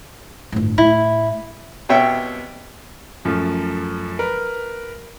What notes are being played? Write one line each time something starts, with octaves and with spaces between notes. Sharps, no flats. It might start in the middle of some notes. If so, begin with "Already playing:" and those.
G1 A2
A2 E4
C2 B2 C#5 E5 G5
F#2 F3 A3
A#4 B4